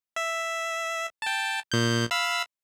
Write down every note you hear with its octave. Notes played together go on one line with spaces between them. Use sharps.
E5
G5 A5
A#2 G6
F5 B5 E6